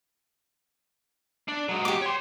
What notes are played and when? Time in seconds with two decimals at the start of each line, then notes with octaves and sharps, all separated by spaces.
1.49 D4 D5
1.69 F#3 G#3
1.85 G4 D6
2.02 C#5 C6